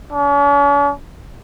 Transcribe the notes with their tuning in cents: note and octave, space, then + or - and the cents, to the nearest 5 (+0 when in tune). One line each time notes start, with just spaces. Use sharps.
C#4 +45